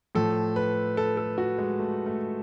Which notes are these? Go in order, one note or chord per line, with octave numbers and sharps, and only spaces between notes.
A2 F3 A4
B4
A4
A4
F#4
G#3
A3
A3